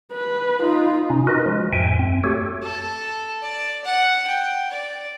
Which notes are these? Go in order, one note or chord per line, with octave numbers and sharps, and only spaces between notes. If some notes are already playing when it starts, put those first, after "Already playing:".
B4
D#4 F4
C3 C#4 D#4
D#4 F4 F#4 A#4 B4 D#5
F3 G#3
F2 A2 E5 G5 G#5
F#2 C4
A3 F#4 G4 A4 C#5
A4
D5
F#5
G5
D5